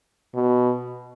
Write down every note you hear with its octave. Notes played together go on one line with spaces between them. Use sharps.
B2